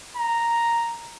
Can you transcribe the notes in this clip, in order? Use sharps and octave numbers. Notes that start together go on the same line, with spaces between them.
A#5